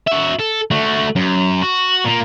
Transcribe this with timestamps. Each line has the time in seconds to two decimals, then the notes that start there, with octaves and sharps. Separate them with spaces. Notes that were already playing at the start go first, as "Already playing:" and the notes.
0.07 F#4 E5
0.39 A4
0.71 A3 F#4
1.16 F#2
1.62 F#4
2.05 A#2 A#3